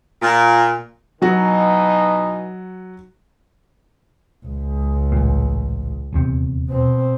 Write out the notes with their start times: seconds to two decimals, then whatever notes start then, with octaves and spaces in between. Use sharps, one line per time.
0.22 A#2
1.22 B2 E3 F#3 D#4 F#4
4.46 C#2
5.12 A1 A#2
6.13 D#1 E2 C3
6.69 B2 C4